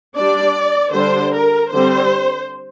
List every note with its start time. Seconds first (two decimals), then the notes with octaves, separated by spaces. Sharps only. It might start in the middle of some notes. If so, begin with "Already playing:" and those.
0.17 G3 D4 D5
0.94 D3 G3 D4 C5
1.33 A#4
1.71 D3 G3 C4 C5